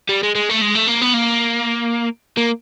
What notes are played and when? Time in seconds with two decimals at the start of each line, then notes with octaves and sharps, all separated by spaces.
0.09 G3
0.23 G#3
0.35 G#3
0.49 A3
0.61 G#3
0.75 A3
0.88 A#3
1.02 B3
1.14 A#3
2.37 A#3